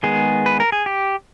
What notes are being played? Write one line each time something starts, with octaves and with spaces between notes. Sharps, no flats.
D#3 G#3 B3 G#4
B4
A#4
G#4
G4